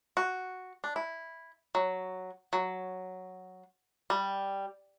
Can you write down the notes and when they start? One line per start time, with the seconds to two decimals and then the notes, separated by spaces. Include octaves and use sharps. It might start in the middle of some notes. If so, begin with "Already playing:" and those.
0.17 F#4
0.84 D4
0.96 E4
1.75 F#3
2.53 F#3
4.10 G3